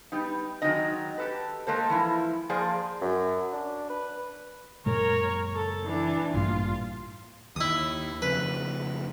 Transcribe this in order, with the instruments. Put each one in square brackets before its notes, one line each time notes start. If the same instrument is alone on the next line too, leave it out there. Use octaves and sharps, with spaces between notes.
[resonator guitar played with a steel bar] G3 B3 D#4
D#3 F#3 G#3 C4 D#4 D#5
G4 A4 B4
G#3 A#3 A4 C5
E3 F3 E4
F3 A#3 G#4 C5 D5
[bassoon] F#2
D4
B4
[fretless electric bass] F#1 A#2 G#3 [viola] A#4 C#5
[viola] A4
E3 D4
[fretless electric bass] A1 G2 A#2 [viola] F4
[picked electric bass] D#2 [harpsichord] E4 D#6
[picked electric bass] F2 C#3 [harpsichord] B4